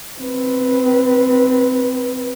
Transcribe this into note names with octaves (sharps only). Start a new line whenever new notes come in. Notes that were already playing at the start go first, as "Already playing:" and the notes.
C4 B4